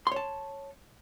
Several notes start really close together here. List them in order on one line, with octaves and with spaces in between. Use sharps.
C6 C#5 A5